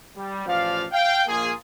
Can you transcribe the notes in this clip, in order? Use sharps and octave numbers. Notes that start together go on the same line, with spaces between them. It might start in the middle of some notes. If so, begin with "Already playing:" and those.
G3
A1 F3 D5 F5
F5 G5
A#1 A#3 F4 G#4